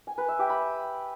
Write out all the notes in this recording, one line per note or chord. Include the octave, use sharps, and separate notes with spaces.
G#5
B4
E5
G4
B5